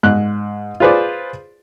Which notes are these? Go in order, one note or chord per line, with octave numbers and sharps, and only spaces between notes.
G#2 F#6
F4 G#4 B4 C5 D5